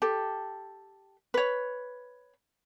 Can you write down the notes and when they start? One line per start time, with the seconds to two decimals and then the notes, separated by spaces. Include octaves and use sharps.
0.02 G4 A4
1.34 B4 C#5